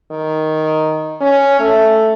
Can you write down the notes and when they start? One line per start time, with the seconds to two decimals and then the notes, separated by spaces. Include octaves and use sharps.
0.11 D#3
1.21 C#4
1.60 A3